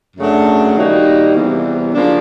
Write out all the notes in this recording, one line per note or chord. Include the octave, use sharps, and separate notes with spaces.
F#2 C#3 F#3 A3 D4
D#3 G3 A#3 D#4 F#4
E2 C3 E3 G3 C4
C#3 F3 A#3 D4